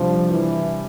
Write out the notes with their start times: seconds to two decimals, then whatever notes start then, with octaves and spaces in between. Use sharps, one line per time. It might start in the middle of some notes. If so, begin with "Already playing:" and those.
Already playing: C3 F3 G3 D4
0.30 E3